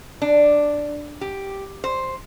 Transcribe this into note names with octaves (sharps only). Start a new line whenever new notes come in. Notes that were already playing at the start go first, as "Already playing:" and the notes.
D4
G4
C5